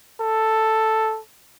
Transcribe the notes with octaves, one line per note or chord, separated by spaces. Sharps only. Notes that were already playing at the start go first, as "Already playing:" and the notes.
A4